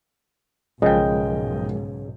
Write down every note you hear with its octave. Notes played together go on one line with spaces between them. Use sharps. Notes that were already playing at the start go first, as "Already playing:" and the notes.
B1 G#2 C#3 F3 G#3 A#4 D#5 G5